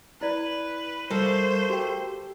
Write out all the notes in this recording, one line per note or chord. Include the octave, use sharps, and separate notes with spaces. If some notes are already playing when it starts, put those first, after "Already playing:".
E4 B4 D5
G3 A3 A#3 C5
F#4 G4 G5